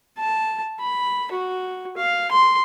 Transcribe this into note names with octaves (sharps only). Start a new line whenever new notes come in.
A5
B5
F#4
F5
C6